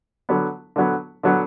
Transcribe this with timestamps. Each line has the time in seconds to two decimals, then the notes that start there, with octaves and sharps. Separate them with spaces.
0.29 D3 F#3 B3
0.76 D3 F#3 B3
1.23 D3 F#3 B3